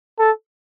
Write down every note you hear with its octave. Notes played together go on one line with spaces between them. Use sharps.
A4